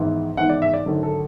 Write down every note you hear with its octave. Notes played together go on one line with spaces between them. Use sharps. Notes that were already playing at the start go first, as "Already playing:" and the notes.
Already playing: G#1 G#2 E3 B3
G#1 G#2 E3 B3 F#5
D5
E5
D5
G#1 F#2 D3
A4